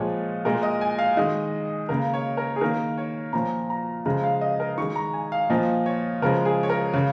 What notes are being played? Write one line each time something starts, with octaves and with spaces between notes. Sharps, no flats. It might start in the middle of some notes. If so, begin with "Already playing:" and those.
Already playing: A#2 F3 G#3 C#5
A#2 G#3 A#4
D#5
G#5
F5
D#3 G#3 D#5
C#3 A#3 A#4
C#5
A#4
G#4
D#3 A#3 A#4
C#5
A#2 F3 A#3 A#5
A#5
C#3 F3 G#3 A#5
F5
D#5
A#4
D#3 G#3 C#6
A#5
G#5
F5
A#2 F3 A#3 D#5
C#5
C#3 F3 G#3 A#4
G#4
C#5
A#4
C#3 C#5